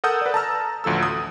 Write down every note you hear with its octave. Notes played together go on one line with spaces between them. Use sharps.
A4 A#4 F#5 D#6 E6 G6
B4 D5
A5 A#5 E6 F6
A1 D2 F3 A4 E6
D#6